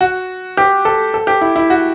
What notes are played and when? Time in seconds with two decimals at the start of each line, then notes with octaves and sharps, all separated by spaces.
0.01 F#4
0.57 G4
0.85 A4
1.14 A4
1.27 G4
1.41 E4
1.56 E4
1.70 F#4